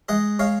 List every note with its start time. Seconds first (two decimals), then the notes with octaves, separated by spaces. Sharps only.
0.09 G#3 D#5 F#5
0.39 G#3 C#5 F5